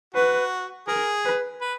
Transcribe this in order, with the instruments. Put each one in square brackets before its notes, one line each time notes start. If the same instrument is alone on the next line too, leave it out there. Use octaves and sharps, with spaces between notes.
[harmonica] F#4 [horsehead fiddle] B4
[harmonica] G#4 [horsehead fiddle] A#4
[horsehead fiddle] B4
[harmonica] B4